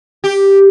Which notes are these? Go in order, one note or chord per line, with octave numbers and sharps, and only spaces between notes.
G4